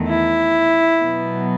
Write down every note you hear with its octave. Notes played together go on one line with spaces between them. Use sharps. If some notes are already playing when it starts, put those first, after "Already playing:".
Already playing: E2 D#3 A3
E4
B2 F#3 B3